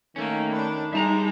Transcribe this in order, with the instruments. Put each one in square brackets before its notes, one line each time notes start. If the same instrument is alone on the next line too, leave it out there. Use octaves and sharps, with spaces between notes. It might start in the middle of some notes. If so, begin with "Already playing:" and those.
[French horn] D#3 [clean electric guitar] A3 C#4 [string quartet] A#3
[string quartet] D4 [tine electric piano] C#5 B5
[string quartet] G3 G#3 [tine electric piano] D#4 D#5 [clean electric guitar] E5 A5 A#5